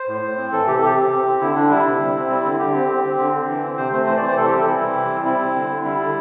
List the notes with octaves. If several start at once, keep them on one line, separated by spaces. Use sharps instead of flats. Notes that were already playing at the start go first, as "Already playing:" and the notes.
Already playing: C5
A2
A2
C4
E3 A4
C3 G4
A4
C3 G4
C4
C4
C4
D3 E4
D3 D4
G3 E4
C3
C3
C4
G3
D3
D3 G4
C4
C4
C4
D3
D3
E3
C4
C3 C5
A3 C5
E3 C5
D5
C4
C5
C3 A4
G4
G3
A4
E3 E4
C4
C3
G3
C4 E4
C4
D3
D3
G3 E4
D3